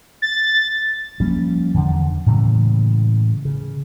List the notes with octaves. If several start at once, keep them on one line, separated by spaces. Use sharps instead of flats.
A6
F3 G3 A#3 C#4
E2 D3 D#3
A2 C#3 E3 G#3
C#3